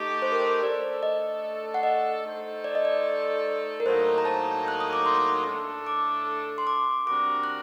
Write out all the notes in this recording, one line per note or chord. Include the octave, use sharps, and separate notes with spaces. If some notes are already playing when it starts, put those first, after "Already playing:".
Already playing: A3 D#4 G4
C5
A#4
C5
A3 D4 A4 D5
D#5
F#5
D#5
A3 D#4 A4 C5
D5
D#5
D5
A#4
A2 F#3 A#3 D#4 C5
A#5
A5
F#6
D#6
D6
C6
A2 A3 D4 A4
D6
C6
D6
C3 G3 D4 F#4 A#4 D6
F#6